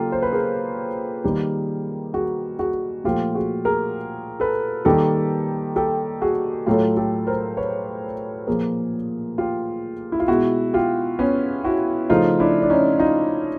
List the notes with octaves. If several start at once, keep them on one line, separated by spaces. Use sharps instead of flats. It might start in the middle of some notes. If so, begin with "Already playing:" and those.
Already playing: C#3 F#3 A#3 F4 G4 A4
C5
B4
G#4 A#4
D#3 G3 A#3
F#4 G#4
F#4 G#4
A#2 F3 A3 F4 G4
F#4 G#4
G#4 A#4
A4 B4
D#3 G3 A#3 G4 A4
G4 A4
F#4 G#4
A2 F#3 A3 F4 G4
G4 A4
A#4 C5
B4 C#5
A#2 F3 A#3 G#4 A#4
F4 G4
E4
F4
B2 G#3 E4 F#4
F4 G4
B3 C#4
E4 F#4
C#3 F3 A3 D#4 F4
D4 E4
D4
C#4 D#4
D#4 F4